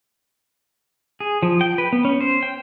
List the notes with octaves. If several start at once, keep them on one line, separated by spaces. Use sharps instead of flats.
G#4
F3
G5
B4
B3
C#4
C5
G5